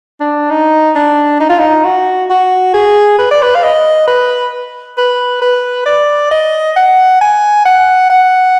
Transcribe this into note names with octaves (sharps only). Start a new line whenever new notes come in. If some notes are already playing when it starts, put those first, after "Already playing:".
D4
D#4
D4
D#4
F4
D#4
F#4
F#4
G#4
B4
D5
B4
F5
D#5
B4
B4
B4
D5
D#5
F#5
G#5
F#5
F#5